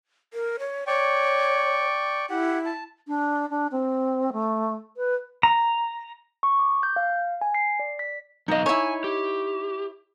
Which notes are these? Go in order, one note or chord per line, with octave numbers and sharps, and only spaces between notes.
A#4
C#5
C#5 D5 G5 C#6
E4 G4 F#5
A5
D4
D4
C4
A3
B4
A#5
C#6
D6
G6
F5
G#5
C7
D5
B6
F#2 B2 D#4 D#5 F5
E4 C#5 G#5
G4